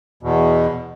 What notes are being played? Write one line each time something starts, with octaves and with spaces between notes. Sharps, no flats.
E2 B2